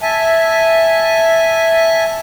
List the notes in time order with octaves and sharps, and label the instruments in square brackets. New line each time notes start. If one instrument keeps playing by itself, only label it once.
[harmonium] E5 G#5 A5